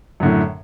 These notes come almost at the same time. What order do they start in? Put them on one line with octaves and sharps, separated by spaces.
F#2 D3 A2